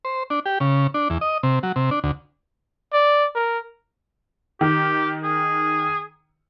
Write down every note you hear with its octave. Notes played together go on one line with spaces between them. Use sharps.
C5
D4
G4
C#3
D4
E2
D#5
C3
F#3
C3
D4
D2
D5
A#4
D#3 G4
G#4